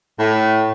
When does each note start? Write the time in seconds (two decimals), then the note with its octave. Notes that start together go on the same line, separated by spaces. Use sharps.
0.19 A2